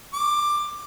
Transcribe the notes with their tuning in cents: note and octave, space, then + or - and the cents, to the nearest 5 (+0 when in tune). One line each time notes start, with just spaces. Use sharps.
D6 +15